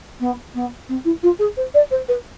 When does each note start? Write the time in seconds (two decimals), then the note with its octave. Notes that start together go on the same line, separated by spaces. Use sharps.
0.20 B3
0.54 B3
0.89 C4
1.04 E4
1.22 F4
1.39 G#4
1.57 C5
1.74 D5
1.91 C5
2.08 B4